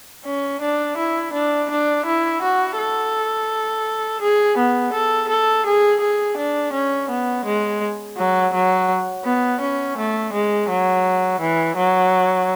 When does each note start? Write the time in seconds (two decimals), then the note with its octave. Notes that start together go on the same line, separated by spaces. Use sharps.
0.25 C#4
0.61 D4
0.97 E4
1.33 D4
1.70 D4
2.06 E4
2.42 F#4
2.78 A4
4.21 G#4
4.57 B3
4.93 A4
5.29 A4
5.66 G#4
6.01 G#4
6.37 D4
6.73 C#4
7.09 B3
7.45 G#3
8.17 F#3
8.53 F#3
9.25 B3
9.60 C#4
9.97 A3
10.33 G#3
10.69 F#3
11.40 E3
11.77 F#3